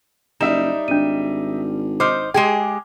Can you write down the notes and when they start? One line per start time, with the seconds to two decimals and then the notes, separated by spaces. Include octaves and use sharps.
0.41 F#1 G3 D#4 E5 E7
0.88 G#1 D4 D#7
2.00 D#4 C5 D6 F6
2.34 G#3 G4 G#4 G5